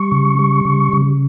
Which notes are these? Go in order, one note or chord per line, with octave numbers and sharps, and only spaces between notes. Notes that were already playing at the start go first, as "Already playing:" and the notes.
Already playing: G3 C#6
C#3
G3
C#3
C#3